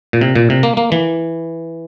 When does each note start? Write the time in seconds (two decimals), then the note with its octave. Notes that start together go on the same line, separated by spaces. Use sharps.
0.13 A#2
0.21 C3
0.36 A#2
0.50 C3
0.63 A#3
0.77 A#3
0.92 E3